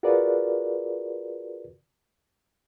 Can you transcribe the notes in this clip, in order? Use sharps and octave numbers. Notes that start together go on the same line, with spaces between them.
F4 F#4 G#4 A#4 B4 D5